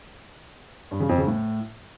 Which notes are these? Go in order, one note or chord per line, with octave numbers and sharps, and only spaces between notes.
G2
C#3
F2
C#3
A2